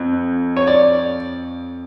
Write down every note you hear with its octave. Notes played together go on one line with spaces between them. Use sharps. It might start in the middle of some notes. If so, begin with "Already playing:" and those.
Already playing: F2
C#5
D5